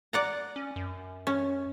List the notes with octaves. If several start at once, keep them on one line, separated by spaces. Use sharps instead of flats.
D5 F#5 A#5
C#4
F#2
C#4